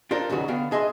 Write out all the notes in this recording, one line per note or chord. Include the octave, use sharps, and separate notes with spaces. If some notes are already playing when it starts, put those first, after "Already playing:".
D4 F4 A4 A#4 C5
D#2 C#3 F#3 F#4 B4
D3 B3 F5 G5
D4 G#4 D#5 E5 C6